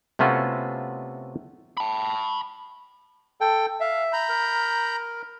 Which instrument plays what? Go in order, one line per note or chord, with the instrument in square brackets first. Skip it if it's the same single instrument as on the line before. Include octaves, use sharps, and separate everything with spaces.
[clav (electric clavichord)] C3 A3 B3 C#4 F4 F#4
[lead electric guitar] A5 B5
[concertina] A4 G5
[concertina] E5 [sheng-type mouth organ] F5
[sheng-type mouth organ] A#5 B5 G6
[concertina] A#4